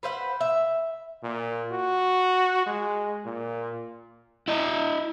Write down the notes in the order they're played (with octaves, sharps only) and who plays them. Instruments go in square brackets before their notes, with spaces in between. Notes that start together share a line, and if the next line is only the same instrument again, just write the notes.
[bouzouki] B4 C5 E5 F#5
E5
[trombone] A#2
F#4
G#3
A#2
[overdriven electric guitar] E4 D#5